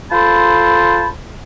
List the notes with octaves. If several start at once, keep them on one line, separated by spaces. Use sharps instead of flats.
F4 A4 C5 A5 B5